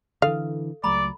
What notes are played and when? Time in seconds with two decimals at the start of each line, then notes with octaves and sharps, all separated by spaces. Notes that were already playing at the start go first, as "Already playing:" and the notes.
0.22 D3 E3 A4 F5
0.84 C#2 F#3 A3 D5 A#5 B5